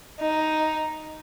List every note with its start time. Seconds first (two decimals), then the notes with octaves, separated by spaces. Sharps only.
0.20 D#4